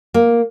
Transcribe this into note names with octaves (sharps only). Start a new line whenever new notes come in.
A#3